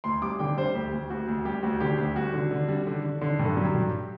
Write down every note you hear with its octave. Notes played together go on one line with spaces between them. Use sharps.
D2 C6
G3 D6
D3 G5
G3 C5
D2 G4
D2
D2 F#4
D2
G3 G4
D2 F#4
D3 G4
D2 G4
G3 F#4
D3
D3
G3
D3
D3
D3
G2
A4
F#3 G4
G2